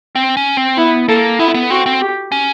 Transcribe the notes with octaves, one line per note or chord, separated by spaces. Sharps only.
C4
C#4
C4
B3 E4
A#3 A4
B3 E4
B3
C4 F#4
C4
G4
C#4